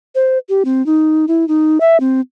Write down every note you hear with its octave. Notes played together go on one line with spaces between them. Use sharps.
C5
G4
C4
D#4
E4
D#4
E5
C4